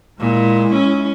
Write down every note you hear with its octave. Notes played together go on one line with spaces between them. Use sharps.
A#2 G#3 E4
C#4